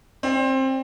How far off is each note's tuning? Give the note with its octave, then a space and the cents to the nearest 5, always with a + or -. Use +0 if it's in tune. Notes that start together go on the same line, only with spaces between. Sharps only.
C4 +20 D5 +0